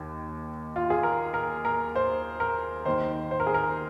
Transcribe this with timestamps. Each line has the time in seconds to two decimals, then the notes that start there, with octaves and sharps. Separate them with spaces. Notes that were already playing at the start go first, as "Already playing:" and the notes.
Already playing: D#2 D#3
0.76 F4
0.90 G#4
1.03 A#4
1.34 A#4
1.65 A#4
1.95 C5
2.40 A#4
2.86 D#2 D#3 C5
3.31 C5
3.40 A#4
3.47 G#4
3.54 A#4